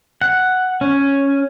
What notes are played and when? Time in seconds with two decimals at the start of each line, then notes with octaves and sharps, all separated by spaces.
0.21 F#5
0.81 C#4